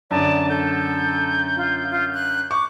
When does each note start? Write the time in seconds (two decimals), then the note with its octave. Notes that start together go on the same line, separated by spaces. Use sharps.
0.11 F#2 D3 D5 A5
0.49 A4 G6
1.56 F4
1.91 F4
2.14 F#6
2.51 C#6 D6